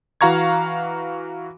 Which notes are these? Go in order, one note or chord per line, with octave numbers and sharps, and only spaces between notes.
E3 F#4 F5 A#5 C#6 G#6